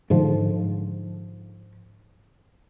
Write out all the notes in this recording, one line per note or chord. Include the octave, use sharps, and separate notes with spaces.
G#2 D3 F3